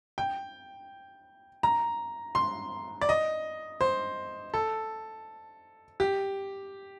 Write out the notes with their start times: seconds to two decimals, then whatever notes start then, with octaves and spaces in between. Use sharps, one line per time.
0.18 G5
1.63 A#5
2.35 C6
3.01 D5
3.09 D#5
3.81 C5
4.54 A4
6.00 G4